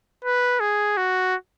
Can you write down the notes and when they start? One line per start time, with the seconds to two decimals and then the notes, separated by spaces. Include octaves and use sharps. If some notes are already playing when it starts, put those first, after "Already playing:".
0.25 B4
0.60 G#4
0.97 F#4